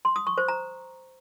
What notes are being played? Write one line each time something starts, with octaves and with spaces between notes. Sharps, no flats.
C6
D#6
C#6
C5
A#5